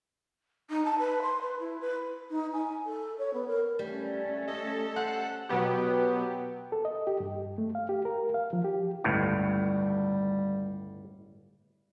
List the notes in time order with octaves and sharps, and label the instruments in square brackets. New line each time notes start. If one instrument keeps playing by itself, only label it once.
[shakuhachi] D#4
A5
B4
C6
B4
E4
B4
[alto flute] D#4
G#5
A4
C#5
B3
A#4
[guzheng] G3 [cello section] A3 C#4
[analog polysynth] A4 [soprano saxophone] D#5
[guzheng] C5 [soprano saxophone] F#5
[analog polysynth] B2 F#3 B3 G4
[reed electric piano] A4
D#5
G4
G2
A3
F5
G4
A#4
F5
F3
G4
[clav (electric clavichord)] G1 C#2 A2 [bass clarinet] G3